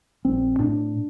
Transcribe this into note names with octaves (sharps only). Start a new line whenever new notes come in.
A#1 C4
A2 D4